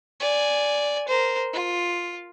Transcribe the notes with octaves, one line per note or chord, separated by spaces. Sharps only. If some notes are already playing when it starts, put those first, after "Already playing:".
D5 G#5
A#4 C5
F4